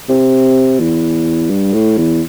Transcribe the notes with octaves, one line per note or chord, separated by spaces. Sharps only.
C3
E2
G2
A2
E2